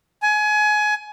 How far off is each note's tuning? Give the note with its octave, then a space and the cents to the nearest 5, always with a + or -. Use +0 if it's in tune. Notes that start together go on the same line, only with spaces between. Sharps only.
G#5 +25